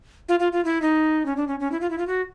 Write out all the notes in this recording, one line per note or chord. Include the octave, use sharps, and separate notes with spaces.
F4
F4
F4
E4
D#4
C#4
D4
C#4
C#4
E4
F4
E4
F4
F#4